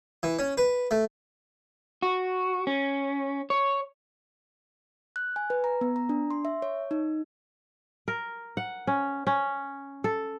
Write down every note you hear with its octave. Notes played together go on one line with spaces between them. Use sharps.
E3
C#4
B4
A3
F#4
C#4
C#5
F#6
G#5
B4
A#5
B3
A#5
D4
C6
E5
C#5
D#4
A#4
F#5
C#4
C#4
A4